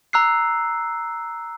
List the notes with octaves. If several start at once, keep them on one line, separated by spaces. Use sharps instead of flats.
A#5 E6 F#6 C7